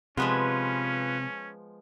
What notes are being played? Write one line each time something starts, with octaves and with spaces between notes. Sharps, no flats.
C3 F3 G#3 B3 C#4 F4 B4